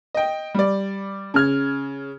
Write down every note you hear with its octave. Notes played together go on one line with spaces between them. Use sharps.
D#5 G5
G3 D5
C#3 F6 G#6